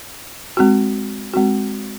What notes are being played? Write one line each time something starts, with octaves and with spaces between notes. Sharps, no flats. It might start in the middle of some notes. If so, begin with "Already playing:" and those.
G#3 C4 F#4
G#3 C4 F#4